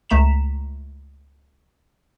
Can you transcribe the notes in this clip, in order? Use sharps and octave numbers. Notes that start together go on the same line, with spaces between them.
C#2 A3 A#5 B6 E7